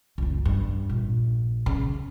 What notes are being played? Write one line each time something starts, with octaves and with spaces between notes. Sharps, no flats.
F#1 C#2
G2
A#1
C#3